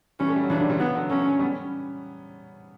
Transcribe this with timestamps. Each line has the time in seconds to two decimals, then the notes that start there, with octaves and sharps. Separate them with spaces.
0.20 E3 G3 C#4
0.28 A3
0.36 G3
0.43 F#3
0.50 C#3 E3 D4
0.60 D3 F#3
0.69 E3 G3
0.80 C#3 E3 B3
0.95 D3 F#3
1.09 F#3 A3 C#4
1.39 G3 B3
1.54 C#4